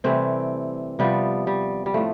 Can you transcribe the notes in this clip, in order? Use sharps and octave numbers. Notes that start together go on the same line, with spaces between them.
C3 E3 G3 A3 C4
C3 F3 G3 B3
G3
G3
A2 F3 A3